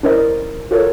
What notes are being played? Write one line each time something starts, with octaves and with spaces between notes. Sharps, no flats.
C#4 E4 A#4 C5 D5 D#5
F4 F#4 A4 A#4 C#5